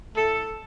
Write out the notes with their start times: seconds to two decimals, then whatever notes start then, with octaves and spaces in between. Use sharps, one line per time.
0.15 A2 A3 A4